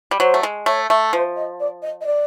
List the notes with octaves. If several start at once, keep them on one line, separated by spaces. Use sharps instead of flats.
G3
F#3 C5
A3
G#3
A3 C#5
A3
F3 C5
D#5
D5
D#5
D#5
D5